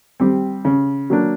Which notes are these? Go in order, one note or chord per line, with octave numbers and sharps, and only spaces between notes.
G3 C4
C#3
F#3 A#3 D4